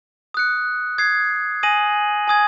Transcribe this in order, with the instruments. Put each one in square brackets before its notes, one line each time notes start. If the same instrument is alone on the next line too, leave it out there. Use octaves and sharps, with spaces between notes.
[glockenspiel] D#6 F#6 C#7
D#6 G#6 C7
G#5 D#6 A#6 D#7 F#7
G#5 D#6 G#6